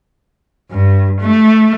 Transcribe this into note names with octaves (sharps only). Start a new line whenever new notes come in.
G2
A3